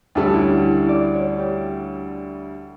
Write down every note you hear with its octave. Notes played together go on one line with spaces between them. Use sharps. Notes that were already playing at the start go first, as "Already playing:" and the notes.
D2 D3 G3 C#4 D4 A4
E4 F#4
E4
F#4
D5
C#5
G4